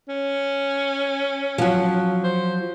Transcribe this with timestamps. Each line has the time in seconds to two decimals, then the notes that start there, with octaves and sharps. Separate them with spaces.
0.08 C#4
1.58 F3 F#3
2.24 C5